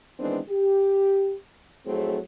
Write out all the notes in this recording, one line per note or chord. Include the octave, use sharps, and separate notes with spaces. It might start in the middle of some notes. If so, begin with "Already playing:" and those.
D#3 E3 G#3 B3 C4 D4
G4
F2 A2 F#3 A3 C4 G#4